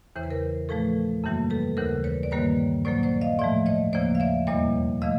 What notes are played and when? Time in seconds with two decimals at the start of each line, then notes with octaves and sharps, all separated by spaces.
0.16 E2 C#3 E3 C5
0.23 B4
0.31 A#4 C5
0.69 A#2 F3 A3 A4 B4
1.24 F#2 C#3 E3 G3 A#3
1.50 A4 B4
1.77 D#2 C#3 E3 A#4 C5
2.04 B4 C#5
2.23 D5
2.31 G2 D#3 G3 A#3 B4 C#5
2.85 A#2 F#3 A#3 C5 D5
3.03 C5 D5
3.21 D#5 F5
3.39 A2 F3 A3 D5 E5
3.66 C#5 D#5
3.93 D#2 C#3 F3 A#3 C5 D5
4.15 F5
4.20 D5 E5
4.47 E2 B2 G3 A#3 C#5 D#5
5.02 C#3 F3 A3 D#5 F5